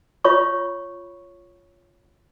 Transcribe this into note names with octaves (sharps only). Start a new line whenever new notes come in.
F4 C#5 B5 C#6